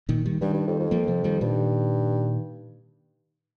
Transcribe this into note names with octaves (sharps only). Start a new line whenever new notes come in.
A#2 D#3
D#3 G3
G2 D#3 G3
G2
F2
F2
F3 A#3
C3 F3
D#3 G3
G2 A#2 D#3